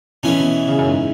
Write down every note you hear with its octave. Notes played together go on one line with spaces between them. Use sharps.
E2 B2 E3 C#4
B2
C#3
F#2
G#2